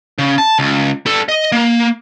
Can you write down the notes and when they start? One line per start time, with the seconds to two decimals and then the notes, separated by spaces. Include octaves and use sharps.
0.19 C#3
0.38 A5
0.59 C#2
1.06 G3 A4
1.29 D#5
1.52 A#3